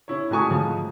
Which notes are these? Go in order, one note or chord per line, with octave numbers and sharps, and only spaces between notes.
C#4 E4 C#5
G#2 A3 F#4 G#5 C#6 D#6
G#2 F3